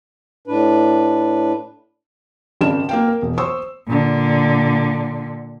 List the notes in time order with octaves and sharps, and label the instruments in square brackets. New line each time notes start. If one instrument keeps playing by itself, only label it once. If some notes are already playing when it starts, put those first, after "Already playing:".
[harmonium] A2 D4 B4
[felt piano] G#1 C#3 D5 A5 E7
A#3 F5 G5
A#4
E1
C5 C#6 D#6 E6
[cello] A#2 D3